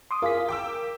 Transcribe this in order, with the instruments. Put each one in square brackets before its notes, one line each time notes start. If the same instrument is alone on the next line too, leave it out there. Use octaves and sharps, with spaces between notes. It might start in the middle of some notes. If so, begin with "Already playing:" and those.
[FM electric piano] C6 D6 D#6
[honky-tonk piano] F4 G#4 [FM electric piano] A#4 B6
[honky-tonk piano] G5 D6 E6